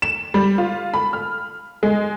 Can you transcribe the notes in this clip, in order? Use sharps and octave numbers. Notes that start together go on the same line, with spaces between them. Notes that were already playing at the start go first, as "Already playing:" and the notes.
E7
G3
F4
B5
F6
G#3